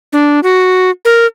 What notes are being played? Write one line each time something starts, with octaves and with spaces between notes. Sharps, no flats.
D4
F#4
A#4